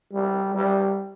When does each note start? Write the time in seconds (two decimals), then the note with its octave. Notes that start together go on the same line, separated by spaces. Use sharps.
0.13 G3
0.55 G3